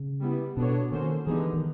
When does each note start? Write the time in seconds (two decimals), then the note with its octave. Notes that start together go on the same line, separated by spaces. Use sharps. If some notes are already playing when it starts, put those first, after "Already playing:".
Already playing: C#3
0.22 G3 B3 E4
0.56 B2 B3 D4 F#4 A4 C#5
0.91 D#3 A#3 C#4 F#4 A4 C5
1.27 D3 E3 G3 B3 D#4 G#4
1.53 D#3